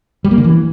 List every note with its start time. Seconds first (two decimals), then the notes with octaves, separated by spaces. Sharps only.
0.25 G3
0.31 A#3
0.38 D3
0.44 E3